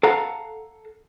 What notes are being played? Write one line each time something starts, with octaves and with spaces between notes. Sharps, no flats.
A4 F5 F#5 A#5